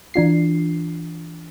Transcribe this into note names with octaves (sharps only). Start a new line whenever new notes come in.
E3 D4 F4 C7